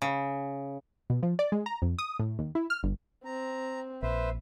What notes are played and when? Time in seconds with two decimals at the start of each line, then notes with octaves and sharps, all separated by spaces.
0.02 C#3
1.10 B2
1.23 F3
1.39 D5
1.52 G#3
1.66 A#5
1.82 F2
1.99 D#6
2.19 A2
2.39 D#2
2.55 E4
2.70 F6
2.83 G1
3.25 C4 A#5
4.03 A#1 B4 C5 E5